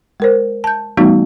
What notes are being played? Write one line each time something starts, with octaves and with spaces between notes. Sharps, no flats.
G#3 A#4 C5
A5 G6
E3 G3 A3 B3 D#4 F#4